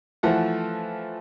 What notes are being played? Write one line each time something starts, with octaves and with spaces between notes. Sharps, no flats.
E3 F3 A3 F#5